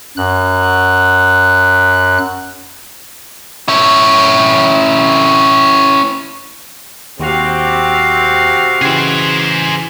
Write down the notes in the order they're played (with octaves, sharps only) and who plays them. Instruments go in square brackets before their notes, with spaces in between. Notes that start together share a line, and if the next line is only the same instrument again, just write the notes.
[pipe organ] F#2 F#6
[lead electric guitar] C#4 E4
[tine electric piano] D#2 [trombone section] C3 C4 G4 [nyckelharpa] F#4 F5
[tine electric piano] C#3 E3 [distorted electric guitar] G#4 C5